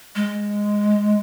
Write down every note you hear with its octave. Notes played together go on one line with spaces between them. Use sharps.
G#3